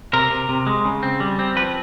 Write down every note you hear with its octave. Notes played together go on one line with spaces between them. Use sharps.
C3 A#4
C3
C3
G#3
C#3
C4
G3
C4
F3 B4